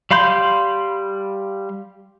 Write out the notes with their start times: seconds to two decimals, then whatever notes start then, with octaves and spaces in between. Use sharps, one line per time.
0.11 G3 F5 B5 C6 G6